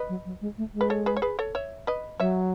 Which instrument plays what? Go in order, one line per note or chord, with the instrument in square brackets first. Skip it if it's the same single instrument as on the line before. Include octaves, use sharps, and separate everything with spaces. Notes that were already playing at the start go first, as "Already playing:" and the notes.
Already playing: [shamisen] B4 D#5
[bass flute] F#3
F#3
G#3
A3
G#3
[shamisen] B4
A4 C#5
G#4 B4
C#5
G#4 B4
A4 C#5
C#5 E5
B4 D#5
[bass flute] F#3 [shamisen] C#5 E5